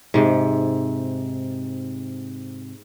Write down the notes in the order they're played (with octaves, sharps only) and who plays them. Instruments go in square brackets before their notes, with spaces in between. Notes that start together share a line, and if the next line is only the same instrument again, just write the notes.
[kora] G#2 C3